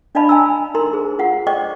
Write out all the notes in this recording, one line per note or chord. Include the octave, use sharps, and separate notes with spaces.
D4 D5 D#5 F5 A5 B5
G#5 A#5 E6
D#4 A#4 A#5 C6
G#4 C5
F4 F5 F#5
C5 D5 D#5 G5 C#6 D6